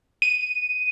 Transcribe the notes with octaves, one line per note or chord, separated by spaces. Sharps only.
D#7